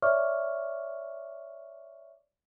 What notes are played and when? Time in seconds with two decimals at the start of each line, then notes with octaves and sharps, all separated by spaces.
0.02 C#5 D5 E5 C#6 D6 F6